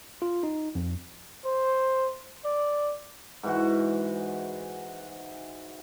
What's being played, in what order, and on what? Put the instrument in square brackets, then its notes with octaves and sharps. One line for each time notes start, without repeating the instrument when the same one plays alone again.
[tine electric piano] F4
D#4
F2
[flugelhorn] C5
D5
[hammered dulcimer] G#2 E3 F#4